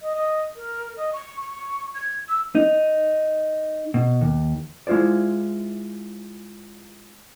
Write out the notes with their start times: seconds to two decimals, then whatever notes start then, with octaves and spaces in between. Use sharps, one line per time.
0.02 D#5
0.15 D#5
0.56 A#4
0.97 D#5
1.13 C#6
1.41 C#6
1.95 G#6
2.29 E6
2.55 D#4
3.94 B2
4.21 D#2
4.87 G#3 E4 F4 C5 D5